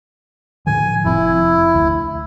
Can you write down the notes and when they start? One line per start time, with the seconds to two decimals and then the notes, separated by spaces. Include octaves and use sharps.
0.67 A2 D3 F3 G#5
1.05 F1 F3 C4 E4
1.75 D2